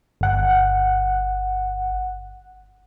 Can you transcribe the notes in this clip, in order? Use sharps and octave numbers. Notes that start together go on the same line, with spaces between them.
G1 F#5